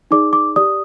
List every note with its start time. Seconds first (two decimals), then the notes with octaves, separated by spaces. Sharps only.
0.11 D#4 G#4 D5 D6
0.33 D6
0.56 G4 D5 D#6